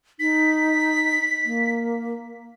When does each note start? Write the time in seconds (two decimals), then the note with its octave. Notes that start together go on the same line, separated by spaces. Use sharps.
0.20 D#4 B6
1.45 A#3